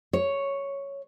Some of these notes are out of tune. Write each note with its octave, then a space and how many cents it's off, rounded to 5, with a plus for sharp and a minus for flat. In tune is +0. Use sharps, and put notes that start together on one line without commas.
C#5 +0